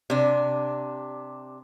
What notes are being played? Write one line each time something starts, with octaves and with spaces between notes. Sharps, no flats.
C3 D4